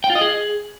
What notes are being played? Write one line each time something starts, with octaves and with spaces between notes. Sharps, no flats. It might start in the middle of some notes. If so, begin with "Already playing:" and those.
G5
F4
D#5
G#4